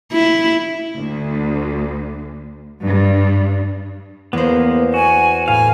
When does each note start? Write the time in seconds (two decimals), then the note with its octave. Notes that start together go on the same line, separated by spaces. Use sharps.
0.13 E4
0.98 D2
2.84 G2
4.33 E2 A#3 B3 C5
4.94 F#4 G#5
5.48 A2 F5 G#5